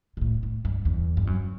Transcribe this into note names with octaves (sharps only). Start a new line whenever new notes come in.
B2
A2
A2
G2
E2
G2
F#2